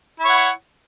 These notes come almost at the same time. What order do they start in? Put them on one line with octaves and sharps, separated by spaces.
E4 C#5 F#5